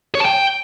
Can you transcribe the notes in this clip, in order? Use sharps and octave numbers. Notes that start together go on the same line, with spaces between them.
C#5
A5
G5